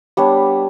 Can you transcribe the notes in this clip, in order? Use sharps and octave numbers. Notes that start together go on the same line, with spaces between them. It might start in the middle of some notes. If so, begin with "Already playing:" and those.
G3 B3 D4 C#5